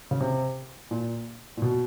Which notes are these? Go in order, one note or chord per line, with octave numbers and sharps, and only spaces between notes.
C#3
C3
A#2
A#2
B2